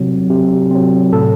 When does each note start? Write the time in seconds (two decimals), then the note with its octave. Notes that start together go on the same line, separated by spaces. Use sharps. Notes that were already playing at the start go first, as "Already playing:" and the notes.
Already playing: C3 F#3 C4
0.30 C3
0.71 F#3 C4
1.12 A2 A4